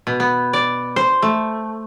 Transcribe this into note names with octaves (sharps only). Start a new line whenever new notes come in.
B2
B3
D5
C5
A3